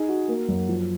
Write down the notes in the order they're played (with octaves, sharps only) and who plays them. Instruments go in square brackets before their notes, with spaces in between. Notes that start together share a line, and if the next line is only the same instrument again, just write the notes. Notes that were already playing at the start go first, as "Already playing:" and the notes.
Already playing: [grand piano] D#4 G#4
F#4
A#3
F#2
F3